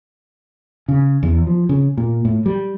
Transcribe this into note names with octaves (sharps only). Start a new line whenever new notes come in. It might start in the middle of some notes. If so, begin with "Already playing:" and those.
C#3
E2
F3
C#3
A#2
A2
G3